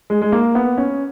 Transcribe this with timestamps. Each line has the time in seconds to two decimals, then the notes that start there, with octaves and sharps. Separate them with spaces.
0.10 G#3
0.22 G#3
0.32 A#3
0.55 B3
0.78 C#4